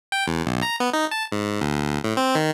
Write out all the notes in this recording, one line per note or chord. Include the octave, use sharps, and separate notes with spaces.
G5
E2
B1
A#5
B3
D#4
A5
G#2
D2
A2
C4
D#3